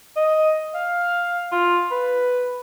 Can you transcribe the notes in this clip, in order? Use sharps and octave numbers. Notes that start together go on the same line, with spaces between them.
D#5
F5
F4
B4